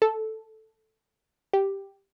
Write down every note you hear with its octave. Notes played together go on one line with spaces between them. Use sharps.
A4
G4